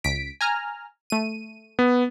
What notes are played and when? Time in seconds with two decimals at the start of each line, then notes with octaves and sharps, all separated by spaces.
0.04 C#2 B6 D7
0.41 G#5 A#5 F6
1.10 A3 D#7
1.79 B3